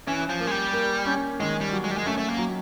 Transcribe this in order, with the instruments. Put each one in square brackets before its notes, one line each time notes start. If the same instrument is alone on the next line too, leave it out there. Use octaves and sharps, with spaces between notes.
[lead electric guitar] E3 [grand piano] C#4
[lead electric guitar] F3
[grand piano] A#3
[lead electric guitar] G#3
G3
[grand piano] A#3
C#4
[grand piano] D#3 [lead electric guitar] G#3
[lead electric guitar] G3
[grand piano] F#3
[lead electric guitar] G#3
G3
G#3
[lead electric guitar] A3 [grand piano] C#4
[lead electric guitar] A3
A#3
[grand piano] F#3